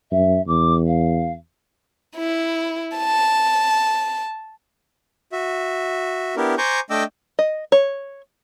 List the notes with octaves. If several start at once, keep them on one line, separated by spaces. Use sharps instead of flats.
F#2 E5
E2 D6
F5
E4
A5
F#4 E5
B3 D4 E4 G4 A#4
C5 G#5 A#5 C#6 D6 G6
A3 D4 D#5 G5 D6 E6
D#5
C#5